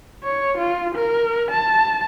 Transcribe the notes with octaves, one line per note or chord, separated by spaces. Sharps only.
C#5
F4
A#4
A5